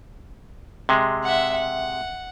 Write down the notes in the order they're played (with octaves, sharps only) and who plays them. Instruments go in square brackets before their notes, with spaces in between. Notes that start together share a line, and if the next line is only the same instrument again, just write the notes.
[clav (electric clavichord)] C3 G#3
[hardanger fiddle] E5 F#5
F#5